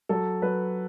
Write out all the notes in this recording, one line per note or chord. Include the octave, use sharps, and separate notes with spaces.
F#3 A4
F#3 B4